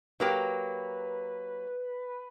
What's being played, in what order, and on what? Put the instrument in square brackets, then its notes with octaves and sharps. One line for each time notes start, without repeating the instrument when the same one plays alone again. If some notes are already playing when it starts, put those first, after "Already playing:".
[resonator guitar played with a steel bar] F#3 A#3 G4 [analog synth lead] B4